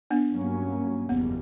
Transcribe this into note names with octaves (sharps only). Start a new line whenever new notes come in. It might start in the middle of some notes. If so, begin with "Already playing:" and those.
B3 D4
G2 F#3 A#3 C#4
F#1 E2 B2 G3 B3